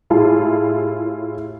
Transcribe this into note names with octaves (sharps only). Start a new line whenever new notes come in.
A2 E4 F4 G4 G#4 A5